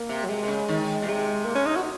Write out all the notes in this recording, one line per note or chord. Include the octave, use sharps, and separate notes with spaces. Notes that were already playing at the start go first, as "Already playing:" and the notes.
Already playing: A#3
C3
F#3
C3 G#3
C3
C#3
D#3
A#2
C3 G#3
A#3
C#4
D#4
F#4